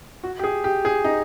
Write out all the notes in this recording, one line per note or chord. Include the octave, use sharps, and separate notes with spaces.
F#4
G4
G#4
G4
G#4
D#4